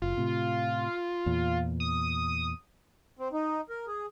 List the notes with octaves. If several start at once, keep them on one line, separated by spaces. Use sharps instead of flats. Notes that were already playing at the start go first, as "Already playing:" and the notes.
F#1 F4
A2 C3
E2 A#2
D#6
C4
D#4
A#4
G#4